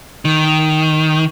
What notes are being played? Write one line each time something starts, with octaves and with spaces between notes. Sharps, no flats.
D#3